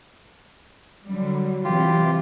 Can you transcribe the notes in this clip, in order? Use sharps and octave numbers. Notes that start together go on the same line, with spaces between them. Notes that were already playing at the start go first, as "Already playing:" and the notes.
D3 F#3 G3
C3 E3 F4 G4